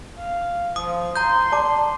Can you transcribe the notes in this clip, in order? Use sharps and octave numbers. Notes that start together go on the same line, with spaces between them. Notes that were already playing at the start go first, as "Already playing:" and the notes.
F5
F3 D#6
A#5 C6 G6
D5 A5 D6